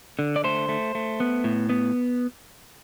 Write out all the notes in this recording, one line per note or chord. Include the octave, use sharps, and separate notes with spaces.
D3
D5
A3 C5
A3
A3
B3
A2
B3